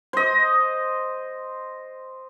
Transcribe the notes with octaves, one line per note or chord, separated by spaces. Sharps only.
C5 D#5